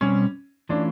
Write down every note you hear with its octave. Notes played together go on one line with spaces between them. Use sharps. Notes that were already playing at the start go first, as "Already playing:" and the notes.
B2 G3 C4 C#4
E3 A3 C#4 D4 F4